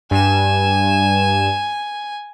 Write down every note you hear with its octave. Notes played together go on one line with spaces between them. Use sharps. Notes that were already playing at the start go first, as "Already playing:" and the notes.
G2 G#5 E7